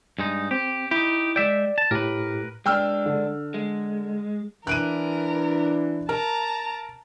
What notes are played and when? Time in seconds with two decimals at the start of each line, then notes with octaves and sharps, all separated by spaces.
0.19 G2 G#3 D#4
0.51 C4 G4
0.91 D#4 E4 G4
1.36 G#3 D5 E5 G5
1.78 A5
1.91 A2 G4 A#4 B4
2.66 G#3 D4 G5 E6 F6
3.06 D3
3.54 G#3
4.67 E3 D4 A#4 F#6 D7 D#7
6.09 A#4 A5 A#5